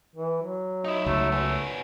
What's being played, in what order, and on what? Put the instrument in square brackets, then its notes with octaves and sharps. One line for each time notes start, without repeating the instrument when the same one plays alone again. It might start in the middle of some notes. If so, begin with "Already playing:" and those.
[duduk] E3
F#3
[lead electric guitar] D#4 E4 [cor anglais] D#5
[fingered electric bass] C#2 [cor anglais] A3
[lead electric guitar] B3 C#4